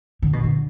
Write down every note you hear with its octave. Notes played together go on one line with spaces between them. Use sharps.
D3
B2
D3